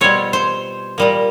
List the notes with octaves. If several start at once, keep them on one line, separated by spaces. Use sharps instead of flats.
B2 G3 C4 F4 C#5
C5
A#2 G3 A#3